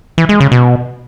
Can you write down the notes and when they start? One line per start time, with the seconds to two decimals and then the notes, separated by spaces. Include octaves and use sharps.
0.18 E3
0.29 G#3
0.40 C#3
0.52 B2